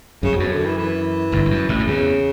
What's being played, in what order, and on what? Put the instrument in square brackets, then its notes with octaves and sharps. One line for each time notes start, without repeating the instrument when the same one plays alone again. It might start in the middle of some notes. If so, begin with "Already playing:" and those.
[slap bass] F#2 [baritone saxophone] C#3
[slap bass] E2
[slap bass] F#2 [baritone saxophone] B2
[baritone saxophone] D3
E3
E3
[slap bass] G1 G2
E2
F#2
A1 A2
F#2
[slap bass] E2 [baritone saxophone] C#3